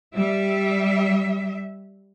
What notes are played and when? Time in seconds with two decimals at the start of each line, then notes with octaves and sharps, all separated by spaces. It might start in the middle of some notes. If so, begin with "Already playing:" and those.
0.17 G3 E5